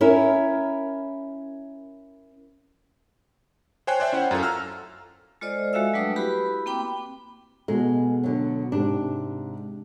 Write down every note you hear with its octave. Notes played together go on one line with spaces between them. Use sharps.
C#4 E4 A#4
C5 C#5 G5 G#5 F#6 C7
C5 D5 E5 G5
C#4 E4 C5 C#5 F#5
F#2 F4 F#4 A4
A#5 E6 F6
G#3 F4 A4 C5 D5 D#5
G#3 F#4 A4 E5 F5 E6
F#3 G3 A3 D4 B4 D#6
E4 F#4 G4 B4 B5
A#3 C4 G5 B5 D6
B2 G#3 A4
D3 F#3
G#2 C3 D4